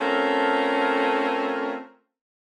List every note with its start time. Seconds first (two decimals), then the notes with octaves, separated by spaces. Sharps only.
0.01 A3 C4 C#4 F4 A4 A#4